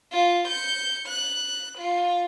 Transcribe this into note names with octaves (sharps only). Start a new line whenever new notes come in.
F4
G6 C#7
F#6
F4